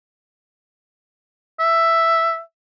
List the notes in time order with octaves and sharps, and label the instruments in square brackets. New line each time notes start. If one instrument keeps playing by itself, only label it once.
[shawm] E5